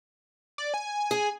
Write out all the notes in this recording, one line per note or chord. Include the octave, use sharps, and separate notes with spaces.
D5
G#5
G#4